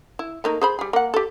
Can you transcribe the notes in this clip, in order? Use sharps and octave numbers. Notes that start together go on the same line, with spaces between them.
E4
A3 A#3 D#4
G#4 C5 B5
G3 G#4
A#3 F#5
G4 A4